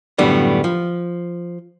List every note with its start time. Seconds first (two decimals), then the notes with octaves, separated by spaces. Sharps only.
0.18 F#2 A2 D3 G3 B3
0.64 F3